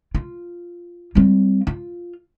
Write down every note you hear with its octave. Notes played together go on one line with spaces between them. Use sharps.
F4
G3 C4
F4